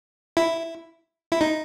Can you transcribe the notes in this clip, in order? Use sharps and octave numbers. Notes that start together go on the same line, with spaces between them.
E4
E4
D#4